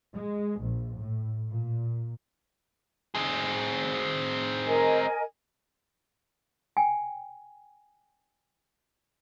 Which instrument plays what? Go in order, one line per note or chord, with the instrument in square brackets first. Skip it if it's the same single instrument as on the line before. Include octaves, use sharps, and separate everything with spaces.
[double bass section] G#3
A#1
A2
A#2
[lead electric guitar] C4 G#4
[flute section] A#4 D#5 G#5
[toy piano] G5 G#5